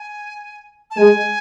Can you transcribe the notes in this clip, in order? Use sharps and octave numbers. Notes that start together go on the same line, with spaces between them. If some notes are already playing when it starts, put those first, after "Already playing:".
Already playing: G#5
A5
G#3 G#5